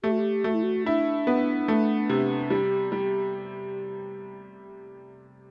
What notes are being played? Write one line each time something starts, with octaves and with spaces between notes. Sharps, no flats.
A3 G4
F#4
G4
A3 F#4
E4
F#4
D4 E4
B3
A3
C3
G3
G3